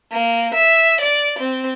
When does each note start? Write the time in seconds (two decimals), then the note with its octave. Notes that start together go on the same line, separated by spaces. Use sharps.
0.12 A#3
0.54 E5
1.01 D5
1.39 C4